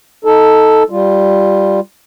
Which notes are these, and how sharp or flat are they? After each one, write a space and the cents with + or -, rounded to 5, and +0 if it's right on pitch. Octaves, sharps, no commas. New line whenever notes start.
D#4 +10 A4 +0
G3 +0 F4 +0